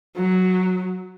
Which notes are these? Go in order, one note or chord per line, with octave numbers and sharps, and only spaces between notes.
F#3